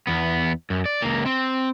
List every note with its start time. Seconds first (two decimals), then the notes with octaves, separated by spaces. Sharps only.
0.07 E2 B3
0.70 F#2
0.86 D5
1.02 C#2 A#3
1.26 C4